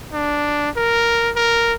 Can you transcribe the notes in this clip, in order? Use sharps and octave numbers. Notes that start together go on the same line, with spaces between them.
D4
A#4
A#4